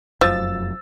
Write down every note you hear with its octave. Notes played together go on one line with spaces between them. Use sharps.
F1 F#2 F3 E6 A6